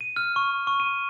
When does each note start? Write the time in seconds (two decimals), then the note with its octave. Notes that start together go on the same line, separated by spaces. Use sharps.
0.01 D#7
0.16 F6
0.36 C#6
0.67 C#6
0.80 D#7